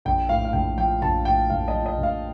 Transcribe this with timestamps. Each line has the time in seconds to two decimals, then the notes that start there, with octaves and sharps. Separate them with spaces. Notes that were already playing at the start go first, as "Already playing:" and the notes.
0.05 A#1 G5
0.29 A2 F5
0.45 F5
0.53 A#1 G5
0.78 F3 G5
1.02 A#1 A5
1.25 A2 G5
1.50 A#1 F5
1.68 D#5
1.74 F3
1.86 D#5
1.98 A#1
2.03 F5